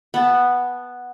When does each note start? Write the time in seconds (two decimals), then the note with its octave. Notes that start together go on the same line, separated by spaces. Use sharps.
0.14 B3 A5